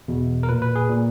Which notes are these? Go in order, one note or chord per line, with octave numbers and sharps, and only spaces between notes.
E2 B2
A#4
A#2 B4
B4
G#4
A#2